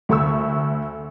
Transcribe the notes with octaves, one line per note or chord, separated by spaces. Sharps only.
D2 A3 C#6 E6